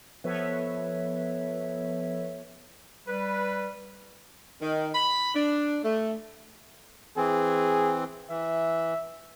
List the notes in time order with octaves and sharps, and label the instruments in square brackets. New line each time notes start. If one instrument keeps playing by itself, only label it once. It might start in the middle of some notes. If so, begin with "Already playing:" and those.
[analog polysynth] F3 B3 A4 B4 C#5 E5
[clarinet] G3 [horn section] B4
[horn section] D#3
B5
D4
A3
[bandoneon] E3 C4 [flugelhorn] G#4
[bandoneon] E3 [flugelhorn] E5